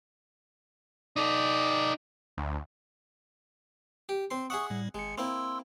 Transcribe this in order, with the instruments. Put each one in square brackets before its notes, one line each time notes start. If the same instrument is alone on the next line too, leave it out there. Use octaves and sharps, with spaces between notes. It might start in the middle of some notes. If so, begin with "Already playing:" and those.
[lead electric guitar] D#4 A4 [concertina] D5 D#6
[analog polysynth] D2
[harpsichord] G4
C4 C6
[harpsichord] G#4 E5 F#5 [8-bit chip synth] C#6 D#6
[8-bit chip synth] A2 G3
[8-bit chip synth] G#1 C#7 [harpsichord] G#3
[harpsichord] A#3 C4 E4 [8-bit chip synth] C6 E6